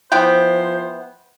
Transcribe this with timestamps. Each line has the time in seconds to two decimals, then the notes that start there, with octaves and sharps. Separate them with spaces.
0.12 E3 F3 B3 C5 G5